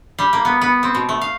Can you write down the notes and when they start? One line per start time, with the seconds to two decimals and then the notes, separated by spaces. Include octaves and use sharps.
0.19 G3
0.33 A#3
0.45 B3
0.61 B3
0.83 C4
0.95 B2
1.09 A3
1.21 F5